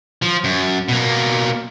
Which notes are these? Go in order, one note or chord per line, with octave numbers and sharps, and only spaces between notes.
F3
F#2
B2 A#3